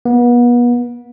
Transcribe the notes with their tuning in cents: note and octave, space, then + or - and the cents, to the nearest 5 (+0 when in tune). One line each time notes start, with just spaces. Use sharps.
B3 -35